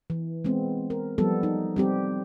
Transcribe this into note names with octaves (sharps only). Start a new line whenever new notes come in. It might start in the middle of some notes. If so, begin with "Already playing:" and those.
E3
G#3 B3 C4
A#4
F3 G3 B3 A4
D#4
G3 C4 G4